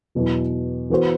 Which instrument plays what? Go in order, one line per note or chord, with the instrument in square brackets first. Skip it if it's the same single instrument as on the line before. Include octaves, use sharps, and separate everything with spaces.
[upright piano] E2 B2 F#3
E3 B3 F#4 C5